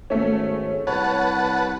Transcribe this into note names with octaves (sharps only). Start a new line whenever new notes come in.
G#1 A3 C#4
C2 B4 C#5 F#5 A5